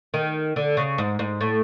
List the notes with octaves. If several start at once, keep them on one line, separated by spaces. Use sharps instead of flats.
D#3
D3
C#3
G#2
G#2
A2